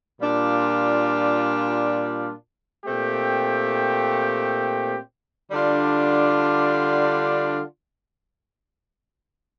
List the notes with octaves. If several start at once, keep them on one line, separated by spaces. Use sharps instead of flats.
A#2 G3 D4 F4
A#2 A3 C4 G4
D3 G3 D4 F4